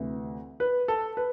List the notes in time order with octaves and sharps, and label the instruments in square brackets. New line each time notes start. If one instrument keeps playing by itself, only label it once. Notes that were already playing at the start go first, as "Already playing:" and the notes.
Already playing: [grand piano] D2 C3 E3
B4
A4
B4